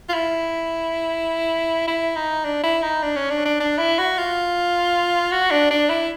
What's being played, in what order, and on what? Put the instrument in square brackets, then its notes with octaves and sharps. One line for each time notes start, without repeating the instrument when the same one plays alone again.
[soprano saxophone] F4
E4
E4
D#4
D4
E4
D#4
D4
C#4
D4
D4
D4
E4
F#4
F4
F#4
D4
D4
E4